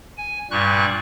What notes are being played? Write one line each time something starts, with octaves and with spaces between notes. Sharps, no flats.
G#5
G2 A#2 G3 C#6 F#6